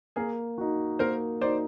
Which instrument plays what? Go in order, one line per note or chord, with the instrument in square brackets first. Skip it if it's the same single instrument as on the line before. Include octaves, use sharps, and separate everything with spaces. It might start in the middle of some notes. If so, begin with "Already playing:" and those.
[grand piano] A#3 [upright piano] G#4 A#4
[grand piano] D#4 F#4
[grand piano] A#3 [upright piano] A#4 C5
[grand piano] D#4 F#4 [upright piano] C5 D5